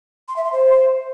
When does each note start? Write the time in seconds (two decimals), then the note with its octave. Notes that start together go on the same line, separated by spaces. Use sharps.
0.28 C6
0.36 E5
0.44 C6
0.52 C5